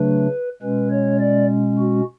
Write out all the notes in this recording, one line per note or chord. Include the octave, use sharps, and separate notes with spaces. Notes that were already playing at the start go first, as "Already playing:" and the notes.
Already playing: C#3 F#3 A3 D4 B4
B2 G#3 C#4 B4
C#5
D5
F#4